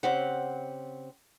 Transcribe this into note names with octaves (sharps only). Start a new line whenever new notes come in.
C#3 C4 G4 F#5